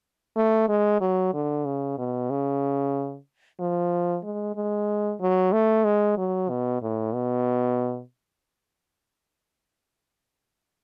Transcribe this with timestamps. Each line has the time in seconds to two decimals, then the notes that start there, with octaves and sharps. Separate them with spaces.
0.36 A3
0.69 G#3
1.01 F#3
1.34 D3
1.65 C#3
1.98 B2
2.30 C#3
3.60 F3
4.24 G#3
4.56 G#3
5.21 F#3
5.53 A3
5.85 G#3
6.18 F#3
6.50 B2
6.82 A2
7.14 B2